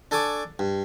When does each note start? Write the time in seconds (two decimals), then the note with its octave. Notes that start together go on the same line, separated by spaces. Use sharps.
0.11 D4 A4 G#5 C#6 D6
0.59 G2